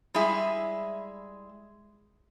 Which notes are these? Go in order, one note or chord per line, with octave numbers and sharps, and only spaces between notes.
G3 G#3 E4 G#4 E5